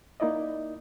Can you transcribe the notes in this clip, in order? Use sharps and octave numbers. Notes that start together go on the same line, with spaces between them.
A#3 D#4 E4 D5 D#5